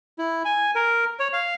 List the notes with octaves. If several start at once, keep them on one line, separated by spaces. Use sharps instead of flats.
E4
G#5
A#4
C#5
F5